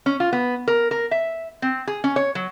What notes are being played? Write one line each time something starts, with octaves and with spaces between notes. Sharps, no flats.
C#4
F4
B3
A#4
A#4
E5
C4
G#4
C#4
C#5
F#3